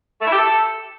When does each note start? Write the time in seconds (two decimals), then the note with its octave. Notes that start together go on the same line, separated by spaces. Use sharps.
0.21 A3
0.27 E4
0.32 G4
0.38 A4